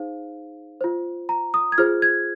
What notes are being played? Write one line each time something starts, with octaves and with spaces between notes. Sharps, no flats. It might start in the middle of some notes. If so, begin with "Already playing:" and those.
Already playing: D#4 G#4 C5 F5
F4 C5
A#5
D#6
G#6
F4 G#4 C5 F6
G#6